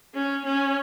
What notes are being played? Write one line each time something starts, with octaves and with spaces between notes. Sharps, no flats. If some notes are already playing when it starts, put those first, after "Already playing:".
C#4
C#4